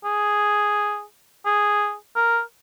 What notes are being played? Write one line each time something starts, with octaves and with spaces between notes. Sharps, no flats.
G#4
G#4
A#4